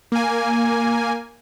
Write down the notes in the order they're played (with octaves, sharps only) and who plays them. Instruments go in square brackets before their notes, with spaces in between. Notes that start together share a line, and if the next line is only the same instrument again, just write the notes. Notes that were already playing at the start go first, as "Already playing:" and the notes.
[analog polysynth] A#3 G#5